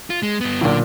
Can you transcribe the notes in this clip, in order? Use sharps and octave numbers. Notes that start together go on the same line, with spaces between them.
F4
G#3
G2 B3
B1 A#2 D3